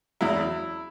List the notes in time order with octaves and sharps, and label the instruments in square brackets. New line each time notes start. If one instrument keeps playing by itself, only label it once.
[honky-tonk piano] E2 C#3 F#3 E4